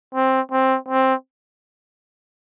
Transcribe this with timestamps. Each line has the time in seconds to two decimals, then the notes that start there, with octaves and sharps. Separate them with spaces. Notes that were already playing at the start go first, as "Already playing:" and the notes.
0.15 C4
0.52 C4
0.89 C4